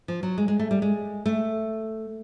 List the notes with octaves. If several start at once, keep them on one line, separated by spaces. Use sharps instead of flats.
F3
F#3
G#3
G#3
A3
G3
G#3
A3